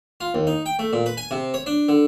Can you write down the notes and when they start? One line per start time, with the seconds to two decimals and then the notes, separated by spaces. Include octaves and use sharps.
0.21 F4
0.34 D#2
0.47 D#4
0.66 G5
0.79 A3
0.93 A#2
1.06 B4
1.17 G#5
1.31 C3
1.54 C#5
1.66 D4
1.88 D3